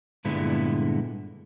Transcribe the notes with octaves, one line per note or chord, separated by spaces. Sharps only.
G2 A#2 D3 G#3 B3 E4